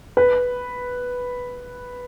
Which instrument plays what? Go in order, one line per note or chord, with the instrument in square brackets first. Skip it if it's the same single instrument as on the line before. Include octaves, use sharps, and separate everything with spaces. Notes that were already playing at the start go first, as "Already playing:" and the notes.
[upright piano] B4